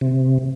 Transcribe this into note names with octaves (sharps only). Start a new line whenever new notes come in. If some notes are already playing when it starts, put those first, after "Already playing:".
C3